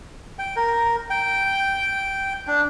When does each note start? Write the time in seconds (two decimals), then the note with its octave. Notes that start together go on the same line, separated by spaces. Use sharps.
0.39 G5
0.56 A#4
1.10 G5
2.47 D4